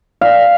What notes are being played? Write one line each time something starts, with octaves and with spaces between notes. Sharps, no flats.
F5